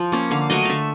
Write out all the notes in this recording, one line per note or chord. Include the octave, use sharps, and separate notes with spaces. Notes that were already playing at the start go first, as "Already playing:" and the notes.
Already playing: F3
A#3 C#4
D3 F5
F#3 A3 D#5
D3 E5 F5